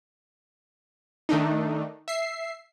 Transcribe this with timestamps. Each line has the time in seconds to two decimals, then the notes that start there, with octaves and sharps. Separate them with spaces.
1.29 D#3 A3 D4 D#4
2.08 E5 C7